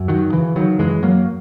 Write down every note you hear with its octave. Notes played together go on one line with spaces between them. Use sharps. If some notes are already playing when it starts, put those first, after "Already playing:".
Already playing: F#2
D#3 F#3
C#3 E3
D#3 F#3
F#2 E3 G#3
F#3 A#3